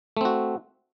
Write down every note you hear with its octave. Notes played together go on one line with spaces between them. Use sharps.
A3 C4 F#4